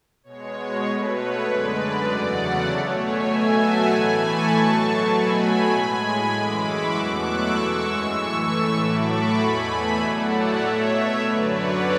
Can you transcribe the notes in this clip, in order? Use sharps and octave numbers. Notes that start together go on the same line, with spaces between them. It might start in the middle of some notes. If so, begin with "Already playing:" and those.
B2 G#3 C#5
B2 A3 B4
C#5
F#2 D3 G#3 B4 D5
E2 C#3 F#3 A3 D5 F#5
B2 A3 C#5
E5 G#5
B2 F#3 A3
F#5 A5
A2 E3 A3 G#5 B5
A5 C#6
B2 F#3 A3
A5 C#6
B2 F#3 A3 G#5 B5
A2 G#3 G#5 B5
F#2 E3 G#3 B5 D6
C#6 E6
E2 B2 F#3 A3 D6 F#6
C#6 E6
F#2 E3 G#3
C#6 E6
A2 E3 A3
C#6 E6
A2 F#3 A3 B5 D6
A5 C#6
E2 B2 A3 G#5 B5
E5 G#5
A2 F#3 A3 D5 F#5
C#5 E5
B2 A3
F#2 D3 F#3 B4 D5
C#5